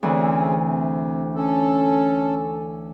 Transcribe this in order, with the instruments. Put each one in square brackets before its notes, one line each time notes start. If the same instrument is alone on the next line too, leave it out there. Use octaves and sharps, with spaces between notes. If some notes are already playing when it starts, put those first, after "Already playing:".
[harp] D2 E3 [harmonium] C4 C#4 G#4
[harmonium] C3
C#4 A4